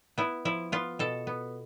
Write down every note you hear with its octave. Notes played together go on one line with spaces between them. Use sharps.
B3 E4
F3 E4
B3 F4
B2 A4
B3